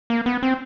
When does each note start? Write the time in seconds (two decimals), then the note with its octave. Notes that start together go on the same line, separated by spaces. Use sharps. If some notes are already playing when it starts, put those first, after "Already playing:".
0.10 A#3
0.26 B3
0.43 C4